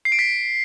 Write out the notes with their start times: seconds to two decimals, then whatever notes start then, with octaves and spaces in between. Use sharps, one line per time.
0.05 C7
0.12 D7
0.19 B6